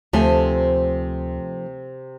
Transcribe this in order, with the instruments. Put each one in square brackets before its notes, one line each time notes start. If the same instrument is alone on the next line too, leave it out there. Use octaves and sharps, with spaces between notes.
[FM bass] D2 [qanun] C3 C6 [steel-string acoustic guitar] F3 A3 G#5